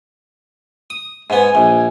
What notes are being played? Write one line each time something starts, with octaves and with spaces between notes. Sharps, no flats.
D#6
G#2 B3 G#5
A#1